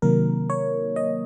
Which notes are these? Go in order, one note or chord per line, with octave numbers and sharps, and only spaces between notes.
C3 D#3 F#3 A#3 A#4
C#5
D#5